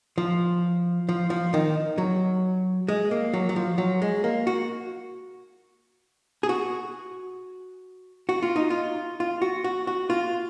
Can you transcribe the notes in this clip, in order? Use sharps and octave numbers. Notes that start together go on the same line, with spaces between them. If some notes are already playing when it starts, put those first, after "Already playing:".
F3
F3
F3
D#3
F#3
G#3
A#3
F#3
F#3
F3
F#3
G#3
A#3
F#4
G#4
F#4
F#4
F4
D#4
F4
F4
F#4
F#4
F#4
F4